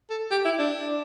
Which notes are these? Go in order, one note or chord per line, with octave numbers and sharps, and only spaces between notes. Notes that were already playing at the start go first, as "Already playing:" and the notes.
A4
G4
E4
D4